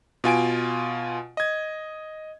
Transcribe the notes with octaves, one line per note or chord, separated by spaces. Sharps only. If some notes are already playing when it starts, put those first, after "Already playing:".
B2 F4 G#5 D7
D#5 G#6